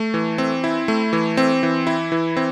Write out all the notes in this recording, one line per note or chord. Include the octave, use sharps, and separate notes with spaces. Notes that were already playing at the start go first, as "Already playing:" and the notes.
Already playing: A3
E3
C4
E4
A3
E3
C4
E3
E4
E3
C4